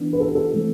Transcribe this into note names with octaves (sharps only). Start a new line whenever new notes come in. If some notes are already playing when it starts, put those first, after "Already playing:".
Already playing: E3 B3 D4
B4
A4
G4
A4
E3 A3 C4